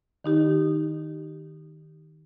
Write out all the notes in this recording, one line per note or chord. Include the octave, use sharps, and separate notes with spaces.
D#3 D#4 G4